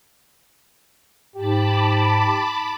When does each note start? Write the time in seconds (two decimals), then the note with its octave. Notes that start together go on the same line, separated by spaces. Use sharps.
1.36 G#2 G4 A5 B5 D6